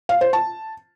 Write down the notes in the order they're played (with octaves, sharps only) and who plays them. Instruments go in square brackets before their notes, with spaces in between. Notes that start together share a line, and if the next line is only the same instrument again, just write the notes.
[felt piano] F5
C5
A5